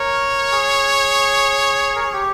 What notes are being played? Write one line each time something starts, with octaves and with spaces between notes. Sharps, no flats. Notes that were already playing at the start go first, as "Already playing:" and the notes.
Already playing: A#4 C#5
G#4
A#4
G#4
G4